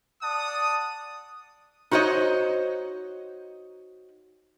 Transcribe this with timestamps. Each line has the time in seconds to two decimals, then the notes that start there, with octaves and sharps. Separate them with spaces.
0.23 D5 F#5 A5 D#6
1.91 D#4 F#4 C5 C#5 D#5